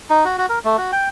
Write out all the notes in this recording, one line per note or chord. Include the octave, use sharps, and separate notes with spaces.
D#4
F#4
F#4
A#4
A3
F#4
G5